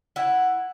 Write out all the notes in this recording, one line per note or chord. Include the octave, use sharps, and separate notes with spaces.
E4 F#5